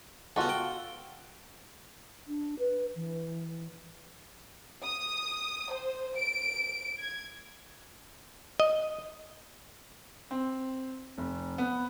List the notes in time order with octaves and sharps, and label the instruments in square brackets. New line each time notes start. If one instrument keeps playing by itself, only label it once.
[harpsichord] C#2 B3 [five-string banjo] F4 F#4 A4
[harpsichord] G5
[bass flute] D4
B4
E3
[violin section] D#6
C5
D7
G#6
[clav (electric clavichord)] D#5
[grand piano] C4
F1
B3